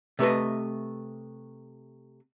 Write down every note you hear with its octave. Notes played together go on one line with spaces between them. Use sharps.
C3 A3 B4 D#5